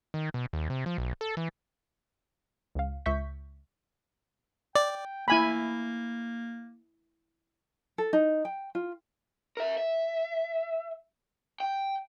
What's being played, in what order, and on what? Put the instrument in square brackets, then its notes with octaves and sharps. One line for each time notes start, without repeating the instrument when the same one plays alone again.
[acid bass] D#3
B2
D#2
C3
F3
B1
A4
E3
[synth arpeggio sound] C#2 F5
C#2 E5 C#6 G6 B6
[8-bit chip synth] D5 [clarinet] G5
[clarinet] A#3 [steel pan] E4 G#5 B5
[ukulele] A4
D#4
G5
F4
[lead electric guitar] A#4 E5
E5
G5